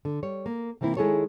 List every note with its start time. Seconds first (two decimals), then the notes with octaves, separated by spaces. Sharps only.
0.05 D3
0.23 G3 C#5
0.46 A#3
0.81 C3 E3 A#3 C4 E4
0.97 D#3 G#3 E4 G#4 A4 C#5